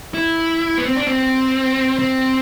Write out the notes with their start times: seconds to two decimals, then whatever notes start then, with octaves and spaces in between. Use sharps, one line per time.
0.14 E4
0.78 B3
0.85 C4
0.96 D4
1.07 C4
1.99 C4